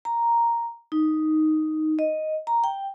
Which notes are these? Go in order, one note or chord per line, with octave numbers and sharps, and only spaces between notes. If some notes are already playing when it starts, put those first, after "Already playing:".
A#5
D#4
D#5
A#5
G5